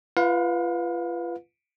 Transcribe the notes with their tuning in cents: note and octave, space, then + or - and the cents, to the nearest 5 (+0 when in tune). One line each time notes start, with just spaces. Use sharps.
F4 -30 B4 +0 F5 +35